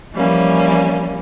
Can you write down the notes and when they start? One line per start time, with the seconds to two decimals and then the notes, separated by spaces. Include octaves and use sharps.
0.13 E3 F3 G3 A#3 C#4